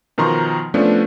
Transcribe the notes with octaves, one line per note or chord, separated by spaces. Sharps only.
B2 D#3 F3 A#5 C6 C#6
F3 A3 B3 C#4 D4